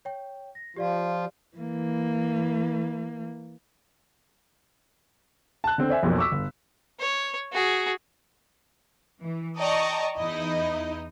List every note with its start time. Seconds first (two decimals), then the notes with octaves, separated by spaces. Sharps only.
0.05 C#5 G5
0.55 A#6
0.76 F3 F4 G4 D5 F5
1.57 E3 A#3
5.64 A5 F#6
5.78 D3 C4
5.89 C5 D5 E5 G#5
6.03 B1 F2 F3 A#3
6.18 C#6 D6 E6 B6
6.32 G1
7.00 C#5
7.52 F#4 G#4
9.22 E3
9.60 D5 D#5 G5 A5 A#5 C#6
10.18 E2 D#4 E4 D#5